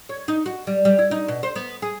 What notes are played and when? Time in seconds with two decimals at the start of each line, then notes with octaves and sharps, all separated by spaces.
0.09 C#5
0.28 D#4
0.46 F#4
0.67 G3
0.85 G3
0.99 E4
1.11 D#4
1.28 B2
1.43 C5
1.55 B3
1.82 G#4